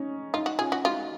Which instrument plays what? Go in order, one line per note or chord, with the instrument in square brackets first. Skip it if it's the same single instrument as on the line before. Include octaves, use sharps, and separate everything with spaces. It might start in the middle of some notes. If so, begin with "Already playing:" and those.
Already playing: [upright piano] C#4 D#4
[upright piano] D#4 [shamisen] F4
[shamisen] F#4
[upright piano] C#4 F4 [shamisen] G#4
[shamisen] F#4
[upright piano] D#4 F#4 [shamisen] F4